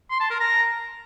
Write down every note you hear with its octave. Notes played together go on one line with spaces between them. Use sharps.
C6
A5
A#4
A#5